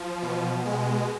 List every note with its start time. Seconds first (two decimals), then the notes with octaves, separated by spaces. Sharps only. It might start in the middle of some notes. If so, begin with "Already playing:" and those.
Already playing: F3
0.22 B2
0.65 G#3